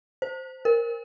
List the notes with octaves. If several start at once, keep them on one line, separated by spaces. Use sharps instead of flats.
C5
A#4